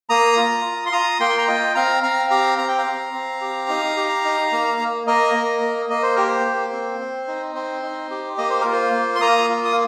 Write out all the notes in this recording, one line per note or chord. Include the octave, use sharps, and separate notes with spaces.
A#3 A#5 D#6
F4
F4
C6
F4 A#5 D#6
A#3 G5 C6
A#5
F4 D#5 G5
C4 F5 A#5
C4 F5 A#5
G4 F5 A#5
C4 A#5
G5
F5 A#5
C4
C4
G4
D#4
G4
D#4
A#3
A#3
A#3 A#4 D#5
A#3
A#3
A#3 D#5
C5
G4 A#4
C5
A#3
C4
C4
D#4
C4 C5
D#4
G4
A#3 D#5
C5
F4 A#4
C5
A#3
C6
A#3 A#5 D#6
F4
D#6